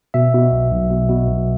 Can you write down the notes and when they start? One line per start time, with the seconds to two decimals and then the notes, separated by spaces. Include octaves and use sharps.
0.14 B2 E5
0.34 B2
0.52 B1
0.72 B1
0.91 B2
1.09 B2
1.29 B1